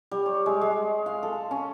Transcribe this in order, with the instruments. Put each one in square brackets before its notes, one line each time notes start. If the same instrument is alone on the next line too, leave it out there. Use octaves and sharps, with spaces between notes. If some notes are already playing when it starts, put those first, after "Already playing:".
[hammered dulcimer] G3
C#5
G#3
G#3
F5
A4
C#4